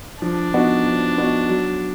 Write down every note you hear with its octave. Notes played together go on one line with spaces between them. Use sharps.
F3 D4
B3 D#4 F#4
F3
B3 D#4 F#4
F#3